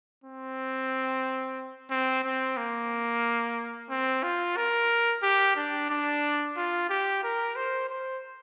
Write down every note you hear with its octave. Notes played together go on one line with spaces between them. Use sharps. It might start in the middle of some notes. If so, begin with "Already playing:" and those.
C4
C4
C4
A#3
C4
F4
A#4
G4
D4
D4
F4
G4
A#4
C5
C5